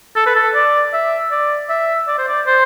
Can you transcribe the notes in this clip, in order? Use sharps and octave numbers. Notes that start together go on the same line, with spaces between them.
A4
B4
A4
D5
E5
D5
E5
D5
C5
D5
C5